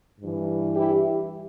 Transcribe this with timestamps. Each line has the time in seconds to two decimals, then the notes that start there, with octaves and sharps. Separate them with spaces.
0.21 G2 E3
0.75 E4 G4